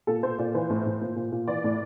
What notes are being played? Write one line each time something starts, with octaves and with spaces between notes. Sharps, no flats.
A#2 A4
A#2 C5
A#2 D5
E3 C5
A2
A2
A#2
A#2
A#2
E3 D5
A2